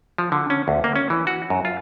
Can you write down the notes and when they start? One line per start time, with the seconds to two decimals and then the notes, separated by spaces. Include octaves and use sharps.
0.18 F3
0.32 D3
0.50 C#4
0.68 D2
0.84 A#3
0.96 C#4
1.10 E3
1.27 F#4
1.50 F#2
1.65 F4